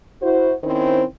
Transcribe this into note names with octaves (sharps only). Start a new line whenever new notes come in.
E4 F#4 C5
D#3 C4 C#4 E4 C5